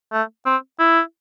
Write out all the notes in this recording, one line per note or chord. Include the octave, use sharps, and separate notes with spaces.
A3
C4
E4